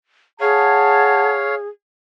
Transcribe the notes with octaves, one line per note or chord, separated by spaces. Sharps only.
G#4 C#5 F5 F#5 A5